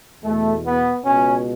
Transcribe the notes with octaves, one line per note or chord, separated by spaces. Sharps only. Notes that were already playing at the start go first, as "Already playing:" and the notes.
E2 B2 A3
B3
C#2 B2 C#4